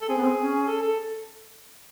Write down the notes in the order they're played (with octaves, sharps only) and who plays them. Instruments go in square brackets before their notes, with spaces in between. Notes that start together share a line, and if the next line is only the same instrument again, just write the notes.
[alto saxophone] A4
[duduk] C4 [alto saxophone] G#4
[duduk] B3
C4
C#4
[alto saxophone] A4
A4